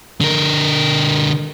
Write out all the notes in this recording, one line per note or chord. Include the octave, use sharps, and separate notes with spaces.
D3 A#4